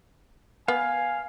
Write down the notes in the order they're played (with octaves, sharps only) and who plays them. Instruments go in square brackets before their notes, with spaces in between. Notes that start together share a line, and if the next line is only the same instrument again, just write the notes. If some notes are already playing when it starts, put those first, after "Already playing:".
[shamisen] B3 [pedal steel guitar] F5 [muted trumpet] G#5